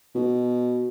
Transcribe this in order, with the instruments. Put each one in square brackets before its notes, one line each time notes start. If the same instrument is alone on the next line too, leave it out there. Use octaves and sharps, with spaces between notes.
[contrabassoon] B2